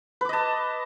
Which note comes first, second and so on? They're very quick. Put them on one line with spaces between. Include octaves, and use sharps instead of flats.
B4 D6 D#5 A5